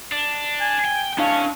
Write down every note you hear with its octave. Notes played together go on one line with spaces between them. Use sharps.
D4
G#5
G5
C#4 D4 F5 A5